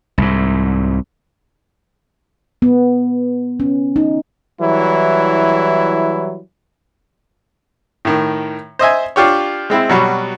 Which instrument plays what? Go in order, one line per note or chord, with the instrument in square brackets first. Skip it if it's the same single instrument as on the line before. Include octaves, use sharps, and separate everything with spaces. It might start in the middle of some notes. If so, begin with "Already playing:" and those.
[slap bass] C2 G#2
[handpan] B3
C#4
D#4
[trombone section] E3 F#3 G3 E4
[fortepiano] A2 D#3
C5 D#5 E5 G#5
D4 F4 G4 C#5
G#3 C4 E4
B2 F#3 G3